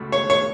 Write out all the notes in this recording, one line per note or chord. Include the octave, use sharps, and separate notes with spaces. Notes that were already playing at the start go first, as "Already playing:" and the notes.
Already playing: C#2 B2 A3
C#5
C#5